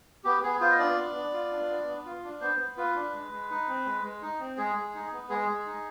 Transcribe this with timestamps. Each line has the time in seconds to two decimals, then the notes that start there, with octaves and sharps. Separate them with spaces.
0.24 B3 G4
0.43 B3 G#4
0.61 F4 C5
0.71 D#5
0.79 D4 D5
0.98 B3
1.15 B3
1.33 F4
1.52 D4
1.69 B3
1.87 B3
2.05 F4
2.24 D4
2.41 B3 C5
2.59 B3
2.77 F4 B4
2.95 D4
3.13 G#3
3.32 G#3
3.50 D#4
3.68 C4
3.85 G#3
4.03 G#3
4.22 D#4
4.40 C4
4.57 G#3 G#4
4.76 G#3
4.94 D#4
5.12 B3
5.30 G#3 G#4
5.49 G#3
5.66 D#4